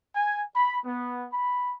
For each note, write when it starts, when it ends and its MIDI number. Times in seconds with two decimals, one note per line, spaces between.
0.15 0.42 80
0.56 0.78 83
0.85 1.28 59
1.33 1.74 83